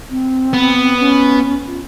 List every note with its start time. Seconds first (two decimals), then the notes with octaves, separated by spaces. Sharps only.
0.10 C4
0.53 B3
0.99 C#4
1.67 F4